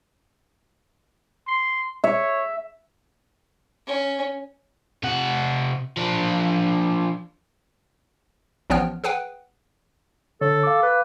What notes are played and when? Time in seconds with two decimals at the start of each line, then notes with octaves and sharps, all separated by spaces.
1.47 C6
2.04 C#5 E5
3.86 C#4
5.03 C3 F#5
5.97 F3 D4
8.70 A1 F3 B3 C#5 G5 F6
9.04 G#4 B4 F#5 G5
10.41 D3 A4 C#5
10.63 F5 D6
10.83 B4